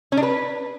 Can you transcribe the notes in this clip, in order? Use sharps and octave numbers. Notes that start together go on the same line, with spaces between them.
C#4
D4
B4